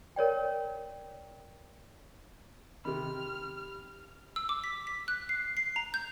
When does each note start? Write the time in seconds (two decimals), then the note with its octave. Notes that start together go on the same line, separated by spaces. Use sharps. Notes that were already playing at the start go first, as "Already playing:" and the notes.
0.16 A#4 C#5 D5 G5
2.85 C3 D#3 G4 B5 F6
4.36 E6
4.49 D6
4.64 B6
4.87 B6
5.08 F#6
5.29 C7
5.57 C7
5.76 A#5
5.94 G6